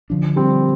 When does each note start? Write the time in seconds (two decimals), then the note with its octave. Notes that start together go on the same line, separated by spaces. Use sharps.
0.10 D3 F3 D4
0.36 G3 C4